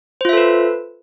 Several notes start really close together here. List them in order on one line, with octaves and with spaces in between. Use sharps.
C5 F4 E5 A4 B4